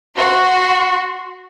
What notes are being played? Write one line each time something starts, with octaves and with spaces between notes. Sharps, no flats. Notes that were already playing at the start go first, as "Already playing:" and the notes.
F#4 C6